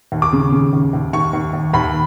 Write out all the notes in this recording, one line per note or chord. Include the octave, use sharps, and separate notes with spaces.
D#2
D6
C#3
C#3
D#2
D#2
D#2 C#6
D#2
D#2
D#2 B5